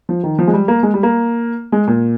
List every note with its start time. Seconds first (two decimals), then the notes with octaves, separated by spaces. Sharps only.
0.09 F3
0.24 D#3
0.39 F3
0.47 G#3
0.53 G3
0.68 A#3
0.83 G#3
0.94 G3
1.03 A#3
1.72 G#3
1.87 A#2